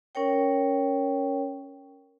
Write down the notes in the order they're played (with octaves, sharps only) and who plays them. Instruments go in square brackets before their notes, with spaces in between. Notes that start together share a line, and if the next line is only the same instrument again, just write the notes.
[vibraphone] C#4 A#4 C#5 G5